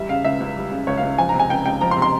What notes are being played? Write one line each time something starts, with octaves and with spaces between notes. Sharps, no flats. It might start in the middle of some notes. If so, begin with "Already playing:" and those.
Already playing: E2 G3 E5
C#3 F5
C#2 E5
C#2
G3
C#3
C#2 C#5
F5
C#2
F3 G#5
A#5
C3
G#5
C#2 G5
C#2 G5
F3 A#5
C6
C3
C6